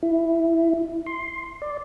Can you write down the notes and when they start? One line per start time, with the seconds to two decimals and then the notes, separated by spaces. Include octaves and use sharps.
0.03 E4
1.06 C6
1.62 D5